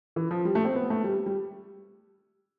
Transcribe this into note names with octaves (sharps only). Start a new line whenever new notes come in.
E3
F3
G3
A3
C4
B3
A3
G3
G3